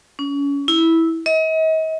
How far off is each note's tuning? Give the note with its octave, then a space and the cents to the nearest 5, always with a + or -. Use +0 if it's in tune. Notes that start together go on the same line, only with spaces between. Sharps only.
C#4 +30
E4 -10
D#5 +40